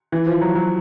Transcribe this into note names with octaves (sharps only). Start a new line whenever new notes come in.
E3
F3
F#3
F#3